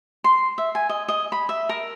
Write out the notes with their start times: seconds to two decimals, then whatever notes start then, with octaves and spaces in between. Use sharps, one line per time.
0.24 C6
0.58 E5
0.75 G#5
0.89 D#5
1.08 D#5
1.32 B5
1.49 E5
1.69 A#4